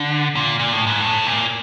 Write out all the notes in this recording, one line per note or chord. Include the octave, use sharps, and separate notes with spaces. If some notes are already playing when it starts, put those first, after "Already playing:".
Already playing: D3
A#2
A#2
A2
G#2
A2
A#2